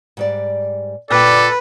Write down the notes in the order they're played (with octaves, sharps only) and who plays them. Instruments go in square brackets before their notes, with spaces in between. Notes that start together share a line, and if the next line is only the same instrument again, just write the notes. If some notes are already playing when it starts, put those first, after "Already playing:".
[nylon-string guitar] G#2 G3 D5
[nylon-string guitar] A#2 F4 G5 [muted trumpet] A4 [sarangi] B4 [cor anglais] D5